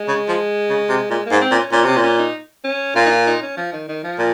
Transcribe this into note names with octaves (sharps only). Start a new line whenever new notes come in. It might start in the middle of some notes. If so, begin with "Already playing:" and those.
Already playing: G#3
C#3
F3
C#3
C3
A#2 G#3
A#3
G#2
C4
A#2
C#4
A#2 C#4
C3 C#4
A#2
C#4
D#4
C#4
A#2 F4
D#4
F4
D#4
C#4
F3
D#3
D#3
F3
A#2